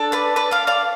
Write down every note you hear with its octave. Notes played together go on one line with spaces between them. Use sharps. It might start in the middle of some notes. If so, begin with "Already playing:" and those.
Already playing: D4 A4
B4 D5
B4 D5
D5 F5
D5 F5